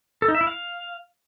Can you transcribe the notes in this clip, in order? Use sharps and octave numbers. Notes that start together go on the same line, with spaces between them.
A4
D#4
E5
E4
F5